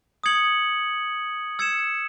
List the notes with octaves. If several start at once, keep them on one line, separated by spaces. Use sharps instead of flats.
D#6 G#6 C#7 F#7
E6 G#6 C#7 E7